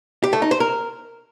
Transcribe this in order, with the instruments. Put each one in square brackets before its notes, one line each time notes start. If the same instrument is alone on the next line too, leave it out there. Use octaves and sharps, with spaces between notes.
[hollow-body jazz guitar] G4
A3
D#4
C5
A#4